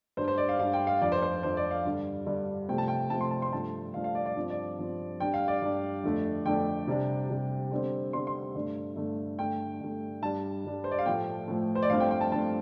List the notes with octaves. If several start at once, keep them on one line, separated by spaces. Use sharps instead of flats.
G2 G3 D4 C5
C5
D5
F5
G2 G3 D4 F5
G5
F5
F2 F3 D4 D5
C5
C5
F2 F3 D4 C5
D5
F5
G2 D3 G3
G2 D3 G3
C3 F3 A3 C4 G5
A5
G5
C3 F3 A3 C4 A5
C6
A5
C6
G2 F3 A3 D4 A5
G2 F3 A3 D4 F5
F5
D5
D5
G2 F3 C4
D5
G2 F3 C4
G2 G3 D4 G5
F5
D5
G2 G3 D4
F2 D3 A3 D4
F2 D3 A3 D4 G5
C3 G3 D4
C3 G3 D4
D3 G3 C4
D3 G3 C4 C6
C6
G2 D3 A3
G2 D3 A3
G2 D3 A3 G5
G2 D3 A3
G2 G3 D4 A5
G2 G3 D4
C5
D5
F5
A2 F3 A3 G5
A2 F3 A3
C5
D5
G2 F3 A3 C4 F5
G5
G5
A5
G2 F3 A3 C4 A5